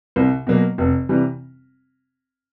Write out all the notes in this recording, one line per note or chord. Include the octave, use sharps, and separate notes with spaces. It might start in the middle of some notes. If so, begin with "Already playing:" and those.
C2
B2 F#3 A#3
F1
C3 E3 G3